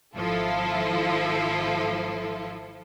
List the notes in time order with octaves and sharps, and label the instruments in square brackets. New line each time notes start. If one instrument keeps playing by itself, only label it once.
[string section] G#1 F3 E4 F4 A4